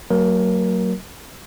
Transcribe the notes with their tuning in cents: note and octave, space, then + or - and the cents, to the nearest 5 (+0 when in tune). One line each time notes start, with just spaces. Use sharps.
F#3 +10 A#3 -35 A#4 +20